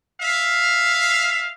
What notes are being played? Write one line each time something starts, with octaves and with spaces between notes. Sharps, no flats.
E5 F5